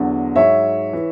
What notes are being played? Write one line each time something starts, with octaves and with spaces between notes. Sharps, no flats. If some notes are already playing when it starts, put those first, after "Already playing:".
Already playing: E2 D3 F#3
G#2 F#3 C#5 E5
E3